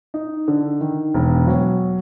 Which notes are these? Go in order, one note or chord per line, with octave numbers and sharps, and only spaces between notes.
D#4
D3
D#3
E1
F#3